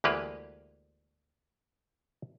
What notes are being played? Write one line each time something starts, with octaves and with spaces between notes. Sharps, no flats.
D2 E3 G#3 A#3 G4 B4